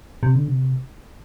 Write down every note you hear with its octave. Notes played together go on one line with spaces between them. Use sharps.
C3
D3
C3